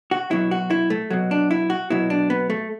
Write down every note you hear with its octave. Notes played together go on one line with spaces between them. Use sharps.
F#4
B2 F#3 E4
F#4
E4
A3
B2 F#3
D4
E4
F#4
B2 F#3 E4
D4
B3
A3